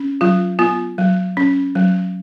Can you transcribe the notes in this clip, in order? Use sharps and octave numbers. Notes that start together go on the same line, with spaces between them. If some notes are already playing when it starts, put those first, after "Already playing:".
Already playing: C#4
F#3 F4
B3 F4
F#3
C#4
F#3